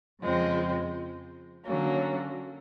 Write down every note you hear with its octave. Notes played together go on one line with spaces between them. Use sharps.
F2 C#3 F3 G#3 C4
D3 F#3 A#3 C#4